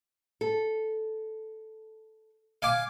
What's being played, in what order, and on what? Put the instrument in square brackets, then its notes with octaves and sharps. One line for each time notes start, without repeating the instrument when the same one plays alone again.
[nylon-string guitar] A4
[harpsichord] F5 G#5 D6